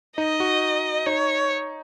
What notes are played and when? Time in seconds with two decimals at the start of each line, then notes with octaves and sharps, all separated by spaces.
0.18 D#4 D#5
0.40 F#4
1.06 D#4 C#5